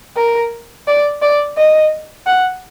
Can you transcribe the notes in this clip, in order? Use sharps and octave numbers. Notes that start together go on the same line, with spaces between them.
A#4
D5
D5
D#5
F#5